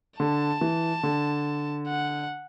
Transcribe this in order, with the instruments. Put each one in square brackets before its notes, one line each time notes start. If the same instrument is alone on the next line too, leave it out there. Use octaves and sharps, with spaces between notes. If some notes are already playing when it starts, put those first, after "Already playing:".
[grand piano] D3 [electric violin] A5
[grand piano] E3
D3
[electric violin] F#5